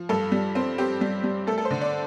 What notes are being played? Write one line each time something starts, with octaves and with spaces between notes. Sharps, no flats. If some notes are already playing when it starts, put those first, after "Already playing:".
Already playing: F3
G2 A4
G3
C4
C4 G4
G3
G3
A3 A4
A4
C5
D3
D5